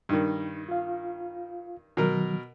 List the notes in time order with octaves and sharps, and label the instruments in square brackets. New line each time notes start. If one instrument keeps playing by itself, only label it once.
[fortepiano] G2 D#3 [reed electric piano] D#4
[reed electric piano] F4 F5
[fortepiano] B2 A#4 [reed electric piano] D#3 F#3